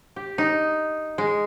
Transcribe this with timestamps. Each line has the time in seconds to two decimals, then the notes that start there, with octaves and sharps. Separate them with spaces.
0.16 G4
0.38 D#4
1.18 G#3